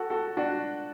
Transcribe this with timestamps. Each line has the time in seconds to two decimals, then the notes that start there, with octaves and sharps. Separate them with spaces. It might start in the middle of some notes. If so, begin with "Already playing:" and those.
Already playing: F#4 A4
0.10 F#4 A4
0.37 D4 F#4